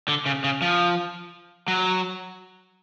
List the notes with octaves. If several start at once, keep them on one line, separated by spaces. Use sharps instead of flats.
D3
C#3
C#3
F3
F#3